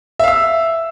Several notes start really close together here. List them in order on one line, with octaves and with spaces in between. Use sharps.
E5 F5 E6